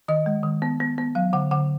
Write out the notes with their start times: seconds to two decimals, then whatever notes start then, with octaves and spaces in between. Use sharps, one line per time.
0.08 D#3 D#5
0.26 G#3
0.43 D#3
0.62 B3
0.80 B3
0.98 B3
1.15 F#3 F5
1.33 D3 F#5
1.51 D3 F#5